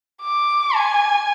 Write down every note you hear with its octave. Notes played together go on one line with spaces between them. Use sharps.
D6
G#5